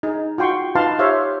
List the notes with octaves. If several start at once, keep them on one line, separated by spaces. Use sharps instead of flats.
D#4 G#4
F4 F#4 G5 C6 C#6
D#4 F4 B4 F5 A5 C6
G4 C5 C#5 E5 F5